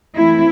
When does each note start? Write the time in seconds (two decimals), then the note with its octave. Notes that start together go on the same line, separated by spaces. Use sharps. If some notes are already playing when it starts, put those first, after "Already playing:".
0.15 E3 A3 C4 E4